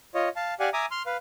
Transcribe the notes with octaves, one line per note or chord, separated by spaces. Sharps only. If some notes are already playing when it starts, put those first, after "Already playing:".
F4 C#5 D#5
F5 A5
G4 D5 F5 F#5 G#5
E5 G#5 A#5 D6 D#6
C6 F6
B4 F5